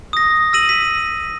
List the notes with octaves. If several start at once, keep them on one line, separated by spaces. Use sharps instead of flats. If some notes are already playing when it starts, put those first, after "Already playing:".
D#6 A#6
E6 A#6 D#7 F#7
B6